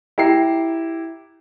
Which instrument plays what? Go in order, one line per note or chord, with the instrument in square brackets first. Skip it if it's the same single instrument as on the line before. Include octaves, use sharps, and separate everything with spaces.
[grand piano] E4 G4 A#5 C7